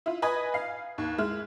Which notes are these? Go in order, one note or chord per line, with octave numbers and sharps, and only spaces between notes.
E4 F4
B4 D#5 G#5 B5 D#6 G#6
F5 C7
D#2
G#3 E4 F6